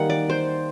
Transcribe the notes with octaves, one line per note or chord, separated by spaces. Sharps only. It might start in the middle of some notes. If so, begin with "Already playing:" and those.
Already playing: D#3 G3 A#3 F#5
D5
C5